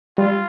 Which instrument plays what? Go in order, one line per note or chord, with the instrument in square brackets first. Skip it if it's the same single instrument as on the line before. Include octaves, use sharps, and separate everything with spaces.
[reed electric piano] G3 [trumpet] F4